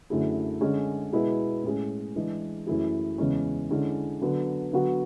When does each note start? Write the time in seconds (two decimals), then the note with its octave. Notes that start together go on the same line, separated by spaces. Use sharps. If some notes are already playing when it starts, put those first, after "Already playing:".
0.10 F#2 D3 A3 E4 G#4
0.61 D3 G#3 C#4 G#4
1.12 B2 G#3 B3 E4 G#4
1.64 A2 G#3 C#4 G#4
2.16 E3 G#3 D4 G#4
2.67 F#2 E3 A3 E4 G#4
3.18 E2 C#3 G#3 C#4
3.70 D3 G#3 C#4 E4 G#4
4.21 D3 F#3 B3
4.73 D3 F#3 B3 F#4